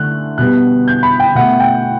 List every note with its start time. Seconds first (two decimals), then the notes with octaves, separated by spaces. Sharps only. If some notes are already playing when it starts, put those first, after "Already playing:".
Already playing: D3 A3 F#6
0.38 B2 G3 B3 F#6
0.88 G6
1.03 B5
1.20 G5
1.35 B2 A3 F#5
1.60 G5